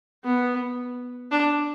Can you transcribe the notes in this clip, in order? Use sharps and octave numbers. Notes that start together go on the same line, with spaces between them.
B3
D4